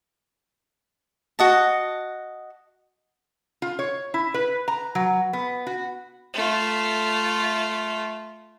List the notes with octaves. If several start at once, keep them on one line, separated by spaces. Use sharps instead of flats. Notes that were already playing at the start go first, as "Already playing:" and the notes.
F#4 D#5 A5
F4
C#5
E4
B4
A#5
F#3
B3
F#4
A3 F4